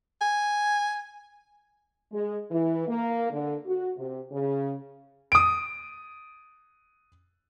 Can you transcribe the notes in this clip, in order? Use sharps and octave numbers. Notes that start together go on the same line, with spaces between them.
G#5
G#3
E3
A#3
D3
F#4
C3
C#3
D#6 D7